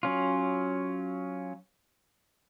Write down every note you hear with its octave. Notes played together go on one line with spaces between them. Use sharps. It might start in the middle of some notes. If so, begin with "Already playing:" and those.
F#3 C#4 F4